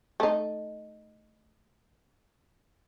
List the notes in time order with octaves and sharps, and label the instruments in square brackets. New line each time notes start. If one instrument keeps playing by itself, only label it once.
[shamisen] A3 D#4